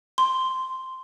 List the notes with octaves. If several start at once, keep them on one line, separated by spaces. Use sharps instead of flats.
C6